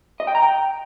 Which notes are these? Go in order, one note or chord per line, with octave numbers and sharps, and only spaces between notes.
D#5
G5
A#5
G5